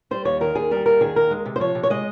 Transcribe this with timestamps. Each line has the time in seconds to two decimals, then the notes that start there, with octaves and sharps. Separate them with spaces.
0.11 G3 C5
0.25 D#2 C#5
0.41 D#3 A#4
0.55 D#2 G#4
0.71 G3 A#4
0.86 D#2 A#4
1.01 D#3 G#4
1.16 D#2 A#4
1.31 G#3
1.46 C3
1.56 C5
1.60 F3 C#5
1.75 C3
1.83 C#5
1.90 G#3 D#5